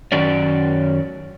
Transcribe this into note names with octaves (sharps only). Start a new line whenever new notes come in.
F#2 D#3 F#3 C#4 D5